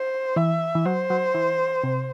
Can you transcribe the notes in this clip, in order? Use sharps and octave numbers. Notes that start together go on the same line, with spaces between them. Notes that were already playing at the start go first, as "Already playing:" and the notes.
Already playing: C5
E3 E5
E3
F#3 C5
F#3
E3
C3